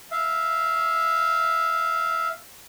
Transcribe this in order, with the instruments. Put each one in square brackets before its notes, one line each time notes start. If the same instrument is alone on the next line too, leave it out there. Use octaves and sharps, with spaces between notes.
[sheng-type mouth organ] E5 F5